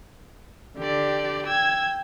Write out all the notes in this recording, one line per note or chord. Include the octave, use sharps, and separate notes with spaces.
D3 G4 D5
G5 E6 G#6